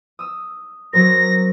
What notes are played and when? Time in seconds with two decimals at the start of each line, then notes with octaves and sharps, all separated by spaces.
0.19 D#6 E6
0.93 F#3 C4 A#4 A#6